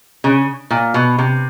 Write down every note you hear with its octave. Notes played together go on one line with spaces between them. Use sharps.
C#3
A#2
B2
C3